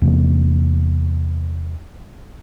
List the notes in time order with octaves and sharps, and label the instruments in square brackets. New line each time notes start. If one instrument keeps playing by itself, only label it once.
[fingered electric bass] E2 C3 A#3